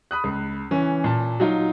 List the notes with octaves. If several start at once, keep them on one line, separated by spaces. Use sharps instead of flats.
B5 D#6 F#6
C#2
E3 C#4
A#2 A5
F#3 D#4 F4